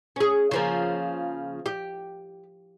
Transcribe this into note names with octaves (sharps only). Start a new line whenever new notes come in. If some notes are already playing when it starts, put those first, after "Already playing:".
C#4 G#4
C#3 F3 A#3
G4